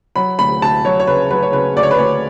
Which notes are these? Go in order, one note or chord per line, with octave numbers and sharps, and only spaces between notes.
F#3 B5
D2 B5
D2 A5
F#3 C#5
C#5
C#3 B4
F#3 B4
C#5
C#3 B4
D2 D5
C#5
B4
D2 C#5